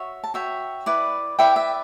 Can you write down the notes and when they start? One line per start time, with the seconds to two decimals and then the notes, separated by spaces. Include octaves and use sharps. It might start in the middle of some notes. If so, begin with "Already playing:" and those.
Already playing: F#4 C#5 E5
0.24 A5
0.34 F#4 C#5 E5 G5
0.86 E4 B4 D5
1.39 E4 B4 D5 E5 G5
1.56 E5